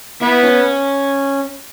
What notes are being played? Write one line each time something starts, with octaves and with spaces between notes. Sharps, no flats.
B3 E4
C#4